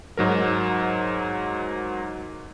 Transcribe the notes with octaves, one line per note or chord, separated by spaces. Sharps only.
G#2 F#3 A#4